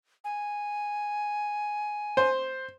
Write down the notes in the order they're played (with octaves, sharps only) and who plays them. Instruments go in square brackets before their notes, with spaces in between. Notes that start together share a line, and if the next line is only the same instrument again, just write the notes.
[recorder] G#5
[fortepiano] C5